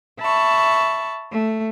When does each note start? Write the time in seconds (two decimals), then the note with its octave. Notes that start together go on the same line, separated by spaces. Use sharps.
0.20 E5 A5 B5 C#6
1.31 A3